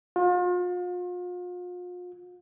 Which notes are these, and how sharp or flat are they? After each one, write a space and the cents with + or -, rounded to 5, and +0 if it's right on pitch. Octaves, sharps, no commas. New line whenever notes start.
F4 +40